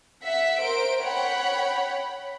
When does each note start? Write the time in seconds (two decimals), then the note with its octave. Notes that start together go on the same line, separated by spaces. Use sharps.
0.24 E5 F#5 B6
0.62 A#4 C5 D7
1.02 C#5 F#5 G5 B5